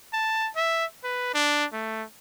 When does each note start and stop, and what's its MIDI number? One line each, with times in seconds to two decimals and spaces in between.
0.13 0.50 81
0.56 0.85 76
1.04 1.32 71
1.34 1.65 62
1.73 2.04 57